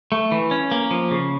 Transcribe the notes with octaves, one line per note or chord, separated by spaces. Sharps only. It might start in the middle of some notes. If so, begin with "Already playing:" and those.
A3
E3
C#4
A#3
F3
C#3